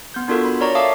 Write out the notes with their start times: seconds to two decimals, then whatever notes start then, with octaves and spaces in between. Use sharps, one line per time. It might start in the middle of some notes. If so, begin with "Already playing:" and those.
0.14 B3 G6
0.28 B3 D4 F4 F#4 A4 A#4
0.45 B5
0.61 A#4 C#5 D5 A#5 C#6
0.75 E5 F5 A5 D6 D#6